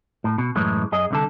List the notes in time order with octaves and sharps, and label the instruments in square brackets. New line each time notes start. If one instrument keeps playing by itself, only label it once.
[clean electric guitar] A2
B2
F#2 A2 E3 G#3
F#2 G#4 D#5
C2 D3 A4